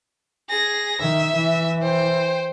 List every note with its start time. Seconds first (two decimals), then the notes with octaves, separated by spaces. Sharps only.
0.50 G#4 A#6
1.01 D#3 E5
1.35 E3
1.82 C5 G5